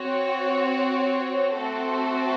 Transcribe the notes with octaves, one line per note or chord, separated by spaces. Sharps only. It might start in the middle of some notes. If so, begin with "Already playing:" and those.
Already playing: C4 F#4 C#5
A3 C4 F#4 A4 C5